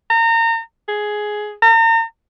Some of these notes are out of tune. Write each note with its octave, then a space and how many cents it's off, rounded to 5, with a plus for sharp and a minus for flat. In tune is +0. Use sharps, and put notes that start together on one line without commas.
A#5 -30
G#4 +10
A#5 -40